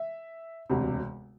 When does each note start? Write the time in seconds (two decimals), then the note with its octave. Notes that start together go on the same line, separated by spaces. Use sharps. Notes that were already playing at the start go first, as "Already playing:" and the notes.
Already playing: E5
0.70 E1 D2 C3